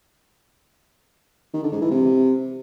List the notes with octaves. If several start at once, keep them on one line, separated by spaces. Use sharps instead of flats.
D#3
D3
G#2
E3
C3